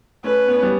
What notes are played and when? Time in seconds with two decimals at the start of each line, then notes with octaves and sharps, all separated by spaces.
0.24 A3 C#4 B4
0.48 B3
0.55 C#4
0.63 G3 B3